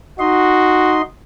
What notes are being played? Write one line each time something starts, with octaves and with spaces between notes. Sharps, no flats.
D#4 F#4 D#5 C6